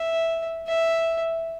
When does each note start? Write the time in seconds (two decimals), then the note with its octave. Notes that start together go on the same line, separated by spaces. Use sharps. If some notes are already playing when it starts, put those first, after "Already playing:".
Already playing: E5
0.67 E5